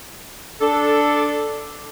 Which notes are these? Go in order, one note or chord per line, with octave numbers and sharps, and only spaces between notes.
D4 A4